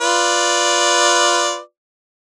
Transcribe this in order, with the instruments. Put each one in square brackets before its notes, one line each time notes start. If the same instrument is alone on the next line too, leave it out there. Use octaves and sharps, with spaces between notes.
[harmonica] F4 B4 D5